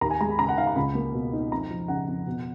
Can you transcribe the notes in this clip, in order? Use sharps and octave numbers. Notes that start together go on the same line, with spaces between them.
D#2 A#5
G#5
G#3 A#5
B5
C#3 A#5
F#5
D#4 F5
A#5
C#2 B5
A#3
B2
D#4
F2 A#5
F3
C#3 F#5
F2
B2